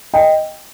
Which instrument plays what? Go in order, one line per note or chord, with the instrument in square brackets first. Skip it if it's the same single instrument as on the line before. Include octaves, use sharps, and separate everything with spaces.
[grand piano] D#5 G5